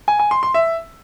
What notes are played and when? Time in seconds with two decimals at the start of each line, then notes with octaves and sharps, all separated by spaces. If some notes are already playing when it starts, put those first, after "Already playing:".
0.08 G#5
0.19 G#5
0.31 C6
0.43 C6
0.54 E5